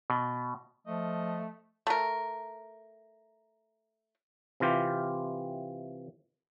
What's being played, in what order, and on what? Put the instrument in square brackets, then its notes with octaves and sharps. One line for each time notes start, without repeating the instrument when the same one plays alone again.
[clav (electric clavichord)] B2
[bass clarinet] F3 [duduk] A3 [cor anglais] D#5
[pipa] A3 A#4
[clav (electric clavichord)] C3 E3 F4 G4